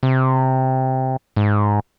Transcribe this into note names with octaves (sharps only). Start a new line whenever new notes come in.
C3
G#2